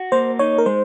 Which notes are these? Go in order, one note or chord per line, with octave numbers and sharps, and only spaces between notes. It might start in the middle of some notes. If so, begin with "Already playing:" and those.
Already playing: F#4
A#3 C5
D#4 C#5
A#4
G#3 C5